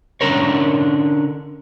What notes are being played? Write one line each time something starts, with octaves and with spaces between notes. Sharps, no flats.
D3 C#4 D4 A#4 C#5